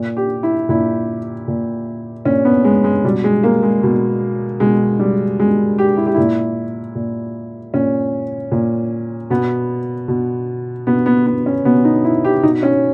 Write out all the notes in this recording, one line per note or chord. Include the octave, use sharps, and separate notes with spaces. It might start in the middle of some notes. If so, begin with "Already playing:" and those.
Already playing: A#2
G4
E4
A#2 E4
A#2
A#2 C#4
B3
G#3
G#3
B2 G3
G#3
A#3
G#3
B2
B2 G#3
G3
B2 G#3
G4
E4
G4
A#2 E4
A#2
A#2 C#4
A#2
B2 B3
B2
B2 B3
B3
B3
C#4
B2 B3
D#4
E4
G4
B2 D#4
C#4